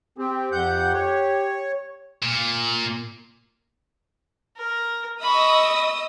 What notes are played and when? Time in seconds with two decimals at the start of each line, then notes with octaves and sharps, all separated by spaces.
0.18 C4 G4
0.52 F2 F#5 G6
0.93 C#5
2.23 A#2
4.57 A#4
5.22 D#5 B5 C#6 D#6 E6